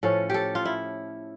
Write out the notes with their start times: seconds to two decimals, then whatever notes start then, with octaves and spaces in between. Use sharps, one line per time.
0.03 A2 F3 C#4 A4
0.30 G4 A4
0.55 F4
0.65 E4